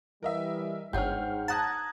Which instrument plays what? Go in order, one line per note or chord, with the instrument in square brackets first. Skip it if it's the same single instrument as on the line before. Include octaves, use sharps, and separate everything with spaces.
[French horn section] E3 G3 [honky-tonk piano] A#4 D#5 E5
[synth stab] G1 [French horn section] G#2 [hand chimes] C#5 F#5 G5 [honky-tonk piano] F6 G6
[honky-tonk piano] F#5 F#6 A#6 [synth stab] A5 [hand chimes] A#5 D#6 G#6